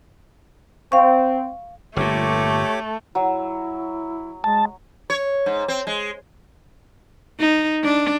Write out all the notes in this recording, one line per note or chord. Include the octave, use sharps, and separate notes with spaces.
C4 F5 C#6
G1 A#2 A3 G4 C#5 D6
F#3 E4
G#3 A5
C#5
G#2
C4
G#3
D#4
D4